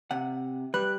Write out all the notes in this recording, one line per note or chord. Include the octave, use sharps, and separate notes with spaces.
C3 F#5
G3 B4 F#6